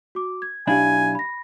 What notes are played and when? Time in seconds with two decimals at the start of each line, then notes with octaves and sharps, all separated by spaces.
0.15 F#4 D6
0.42 G#6
0.67 B1 D4 E4 G4 F5 G#5 B5
1.15 B5 A#6